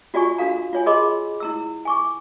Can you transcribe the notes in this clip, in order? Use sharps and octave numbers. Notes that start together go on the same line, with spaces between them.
F4 F#4 D5 G#5 C#6
D4 F#4 A4 F5 A#5
F4 C#5 G#5
G#4 A#4 D#5 B5 C6 D6
E4 A#5 E6
G#5 C#6 D6